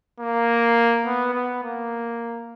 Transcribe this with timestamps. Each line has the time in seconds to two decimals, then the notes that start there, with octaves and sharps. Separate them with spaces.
0.20 A#3
1.05 B3
1.34 B3
1.64 A#3